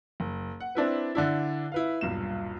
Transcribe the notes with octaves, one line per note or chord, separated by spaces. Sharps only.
F#1
F#5
C4 D4 E4 B4
D3 D4 E4
E4 B4 F5
D#1 B1 G2 E7